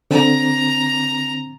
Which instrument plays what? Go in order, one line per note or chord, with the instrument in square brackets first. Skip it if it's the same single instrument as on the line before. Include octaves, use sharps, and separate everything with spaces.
[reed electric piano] D3 C4 [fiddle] A#5